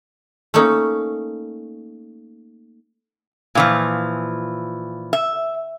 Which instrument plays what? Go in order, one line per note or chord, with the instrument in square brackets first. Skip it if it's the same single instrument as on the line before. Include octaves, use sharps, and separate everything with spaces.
[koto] A3 A#3 C#4 D#4
[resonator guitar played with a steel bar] A#2 E3 F3
E5